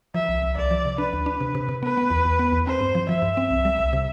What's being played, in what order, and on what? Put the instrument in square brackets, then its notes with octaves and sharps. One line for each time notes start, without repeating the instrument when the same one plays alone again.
[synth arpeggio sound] F3 [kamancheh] E5
[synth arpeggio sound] C2
C2
[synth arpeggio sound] C2 [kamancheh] D5
[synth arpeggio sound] F3
C3
[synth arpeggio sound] D4 [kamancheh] B4
[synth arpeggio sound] D2
D4
C3
C3
C3
[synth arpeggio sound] B3 [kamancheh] B4
[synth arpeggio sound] B3
E2
E2
B3
E2
[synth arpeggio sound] C4 [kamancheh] C5
[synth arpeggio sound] G2
F3
[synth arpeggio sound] F3 [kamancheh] E5
[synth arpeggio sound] G2
C4
C2
G3
C2
C3